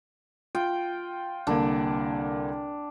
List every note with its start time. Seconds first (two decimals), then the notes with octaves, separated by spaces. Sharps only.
0.55 F4 G5
1.47 C2 D3 A#3 D4